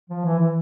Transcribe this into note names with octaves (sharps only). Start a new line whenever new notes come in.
F3
E3
E3